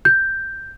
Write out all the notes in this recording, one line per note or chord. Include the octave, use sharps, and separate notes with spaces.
G6